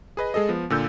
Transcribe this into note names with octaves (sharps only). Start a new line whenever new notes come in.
G#4 B4 D#5
G#3 G#4 A4 D#5
F3 B3
A#2 D3 E6 G6